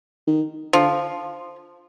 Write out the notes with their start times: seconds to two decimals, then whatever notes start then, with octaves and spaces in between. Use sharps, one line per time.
0.27 D#3
0.73 D3 F3